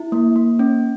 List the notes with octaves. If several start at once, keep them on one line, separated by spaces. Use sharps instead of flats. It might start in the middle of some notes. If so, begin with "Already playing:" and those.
Already playing: E4
A#3
A#3
C#4